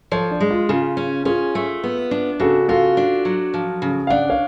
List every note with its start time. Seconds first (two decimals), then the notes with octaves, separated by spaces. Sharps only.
0.11 F3 A4 C#5
0.31 D4
0.40 G#3
0.51 F4
0.69 C#3 F4 G#4
0.97 C#4
1.25 C#4 F4 G#4
1.55 A3
1.84 B3
2.11 D4
2.40 C#3 F#4 A4
2.68 F4 F#4 A4
2.97 D4
3.25 F#3
3.54 F3
3.82 C#3
4.07 F5
4.10 D4 D5 F#5
4.30 C#5 F5